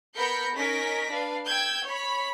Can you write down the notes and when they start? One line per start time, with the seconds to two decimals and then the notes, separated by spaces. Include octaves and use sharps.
0.17 B3 A#4 B5 G6 A#6 C#7
0.55 C#4 D#4 A#4 A#6 B6 D7
1.08 D4 B4 F5
1.47 G5 E6 G6 G#6
1.84 C#5 B5